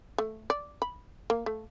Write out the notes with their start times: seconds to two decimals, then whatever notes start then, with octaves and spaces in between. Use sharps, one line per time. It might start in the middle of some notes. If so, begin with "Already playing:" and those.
0.18 A3
0.50 D5
0.82 B5
1.30 A#3
1.46 A3